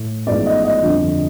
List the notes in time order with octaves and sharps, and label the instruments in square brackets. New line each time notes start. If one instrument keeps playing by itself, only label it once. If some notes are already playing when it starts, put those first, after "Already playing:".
Already playing: [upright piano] A2
A1 G#2 F3 G#3 B3 D5
D#5
D#5
G1 F2 D3